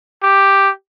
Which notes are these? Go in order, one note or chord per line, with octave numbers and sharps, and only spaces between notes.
G4